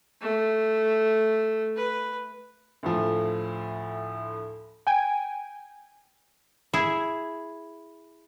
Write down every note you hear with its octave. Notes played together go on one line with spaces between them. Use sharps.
A3
B4
D2 A2 F3
G5 G#5
E4 G#4